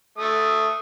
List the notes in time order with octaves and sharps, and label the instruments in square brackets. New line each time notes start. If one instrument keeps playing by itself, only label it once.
[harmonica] A3 D#6